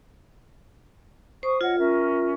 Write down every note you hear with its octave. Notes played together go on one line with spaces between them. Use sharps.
C5 C#6 D#6
F4 C#5 D#5 F#5
C#4 A#4 E5